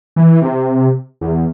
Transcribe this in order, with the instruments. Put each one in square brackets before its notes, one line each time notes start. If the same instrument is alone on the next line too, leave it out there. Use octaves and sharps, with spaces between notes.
[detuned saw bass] E3
C3
E2